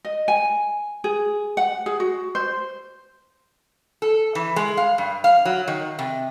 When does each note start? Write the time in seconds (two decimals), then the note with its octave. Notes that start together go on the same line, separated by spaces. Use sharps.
0.05 D#5
0.28 G#5
1.04 G#4
1.57 F#5
1.86 G#4
2.00 F#4
2.35 C5
4.02 A4
4.35 E3
4.56 G#3
4.77 F5
4.98 G2
5.24 F5
5.45 F#3
5.68 D#3
5.99 C3